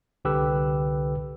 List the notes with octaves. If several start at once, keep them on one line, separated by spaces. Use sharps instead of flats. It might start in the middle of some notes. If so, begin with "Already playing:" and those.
C2 D3 G4 A4 B4 E6